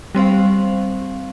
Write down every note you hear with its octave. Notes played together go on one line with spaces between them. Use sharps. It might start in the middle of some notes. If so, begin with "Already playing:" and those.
G3 C4 C5 F5